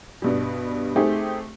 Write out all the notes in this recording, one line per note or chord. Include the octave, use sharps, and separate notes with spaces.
G2 B2 G3
A3 C4 D#4 G4 G#4